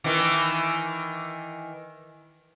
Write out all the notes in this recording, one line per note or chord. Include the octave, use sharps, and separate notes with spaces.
D#3 E3